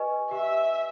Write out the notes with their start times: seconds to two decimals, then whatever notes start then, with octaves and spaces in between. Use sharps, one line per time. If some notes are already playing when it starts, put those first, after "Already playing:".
Already playing: G4 B4 D#5 G#5 C#6
0.31 G4 E5